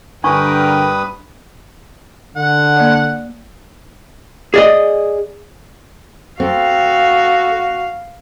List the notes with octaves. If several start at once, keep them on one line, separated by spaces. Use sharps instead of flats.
G2 D3 D4 A#4 B4 G5 C#6 D#6
D3 F#5
A#3 D5
G#4 D5 D#5
C4 F#4 A4 F5